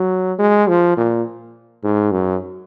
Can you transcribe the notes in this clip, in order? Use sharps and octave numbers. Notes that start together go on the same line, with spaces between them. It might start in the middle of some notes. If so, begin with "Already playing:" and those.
Already playing: F#3
G#3
F3
A#2
G#2
F#2